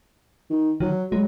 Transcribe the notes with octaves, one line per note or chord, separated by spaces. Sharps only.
D#3
D#3 F#3
F#3 G#3